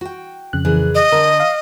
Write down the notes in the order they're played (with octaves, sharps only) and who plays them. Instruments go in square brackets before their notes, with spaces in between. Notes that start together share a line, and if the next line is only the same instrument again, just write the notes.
[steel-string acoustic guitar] F#4 G5
[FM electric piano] F2 C#3 F#6
[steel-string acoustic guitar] A#2 E3 G#4
[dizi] D#5
[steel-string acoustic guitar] D3 D4 [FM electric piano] A#4
[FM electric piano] F5